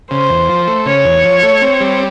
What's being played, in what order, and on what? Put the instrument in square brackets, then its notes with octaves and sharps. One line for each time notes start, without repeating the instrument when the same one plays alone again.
[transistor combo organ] C#3 [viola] C5
[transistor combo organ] E2
F3
A3
[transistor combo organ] C#3 [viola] C#5
[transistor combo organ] E2
F3
A3
C4
G3